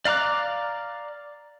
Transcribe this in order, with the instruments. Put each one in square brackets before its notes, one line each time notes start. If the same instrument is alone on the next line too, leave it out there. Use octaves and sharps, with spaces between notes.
[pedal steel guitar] D5 F5 A#5 D6 F#6